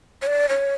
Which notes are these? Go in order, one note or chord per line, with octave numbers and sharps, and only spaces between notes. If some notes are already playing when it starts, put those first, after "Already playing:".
C#5
D5
C#5